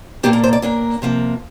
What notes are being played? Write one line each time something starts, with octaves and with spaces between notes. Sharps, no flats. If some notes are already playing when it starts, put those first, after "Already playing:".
A#2 A#3 D4 G4
A#4
C5
D5
A#2 A#3 D4 A#4
C3 F3 A#3